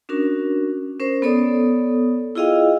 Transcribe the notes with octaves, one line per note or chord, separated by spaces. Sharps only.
C#4 D4 F#4 A#4
C#4 A#4 C5
B3 A4 C#5 D5 D#6
E4 F4 G#4 D#5 F5 G5